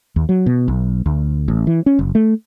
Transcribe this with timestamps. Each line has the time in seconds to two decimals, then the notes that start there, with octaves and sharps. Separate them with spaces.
0.16 D#2
0.29 F#3
0.46 B2
0.68 B1
1.06 D2
1.48 A1
1.67 E3
1.86 C#4
1.99 F#1
2.15 A3